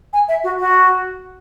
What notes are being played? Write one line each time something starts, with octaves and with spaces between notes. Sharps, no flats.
G#5
E5
F#4
F#4